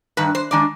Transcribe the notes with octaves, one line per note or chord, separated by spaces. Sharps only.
G2 D#3 B4
C5
D#3 G#3 D4 D5